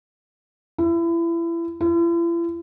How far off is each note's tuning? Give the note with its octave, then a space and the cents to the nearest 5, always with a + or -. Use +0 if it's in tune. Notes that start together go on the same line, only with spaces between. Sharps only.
E4 +30
E4 +45